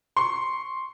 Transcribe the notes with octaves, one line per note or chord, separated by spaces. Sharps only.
C6 C#6